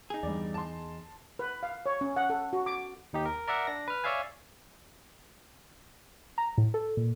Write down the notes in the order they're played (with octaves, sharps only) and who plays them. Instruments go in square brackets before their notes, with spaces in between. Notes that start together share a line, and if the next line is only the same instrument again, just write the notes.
[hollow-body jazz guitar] D#4 G#4
[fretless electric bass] E2 [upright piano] G2 D5
[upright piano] A5 C6
[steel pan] B4
F5
C#5
C#4
F#5
A4
F#4
D6
[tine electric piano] D#2 D#4 G4
A#4
A#4 D5 E5 F#5
D4 A#6
B4 F6
C#5 D5 E5 F5 G#5
[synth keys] A#5
A2
A4
A#2